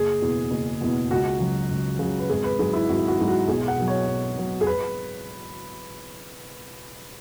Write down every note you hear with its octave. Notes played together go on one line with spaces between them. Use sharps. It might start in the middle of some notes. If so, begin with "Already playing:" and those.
Already playing: F#1 G#4
E2 B2
F#1
E2 B2
C#2 F#4
C#3 F#3
C#2
C#3
F#3
B4
G#1 G#4
B4
G#2 F#3 G#4
E4
G#1 F#4
F#4
G#2 F#3
F#4
B1 G#4
F#5
B2 F#3
C#5
B1
B2 F#3
G#4
B4